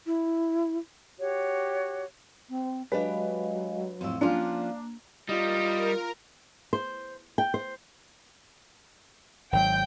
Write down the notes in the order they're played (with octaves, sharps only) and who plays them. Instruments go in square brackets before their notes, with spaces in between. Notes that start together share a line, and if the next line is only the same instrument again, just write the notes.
[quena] E4
[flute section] F#4 G4 C#5
[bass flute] C4
[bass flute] F#3 [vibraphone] G#3 D#5 F5 [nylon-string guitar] D4 G4 [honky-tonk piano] B4
[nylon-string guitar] F2 A2 [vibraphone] C4 E6
[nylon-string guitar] F3 C#4 F4 [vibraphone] A#3 [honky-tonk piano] D4
[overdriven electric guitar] G3 [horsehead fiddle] F4 [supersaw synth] A#4 [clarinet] D#5
[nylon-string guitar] C5
G5
C5
[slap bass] G#1 F#3 [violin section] G5 G6